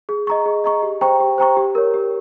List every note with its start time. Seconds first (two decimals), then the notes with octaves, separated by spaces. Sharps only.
0.09 G#4
0.27 D#5 A#5 C#6
0.46 G#4
0.64 D#5 A#5 C#6
0.83 G4
1.01 C5 G5 A#5 C#6
1.20 G4
1.38 C5 G5 A#5 C#6
1.57 G4
1.75 A#4 C#5
1.94 G4